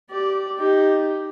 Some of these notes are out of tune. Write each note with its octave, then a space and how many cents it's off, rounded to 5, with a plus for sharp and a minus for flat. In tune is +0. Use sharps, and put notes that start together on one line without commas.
G4 -20 D5 +0
D#4 +0 G4 +0